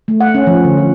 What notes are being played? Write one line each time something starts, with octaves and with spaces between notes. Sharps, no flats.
A3
F#5
C#4
F3
D3
F3